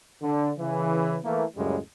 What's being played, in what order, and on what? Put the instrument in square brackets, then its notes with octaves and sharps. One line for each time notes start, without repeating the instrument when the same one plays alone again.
[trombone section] D3
C#3 E3
E3 A3 A#3
C#2 F#2 A2 C#3 G3 G#3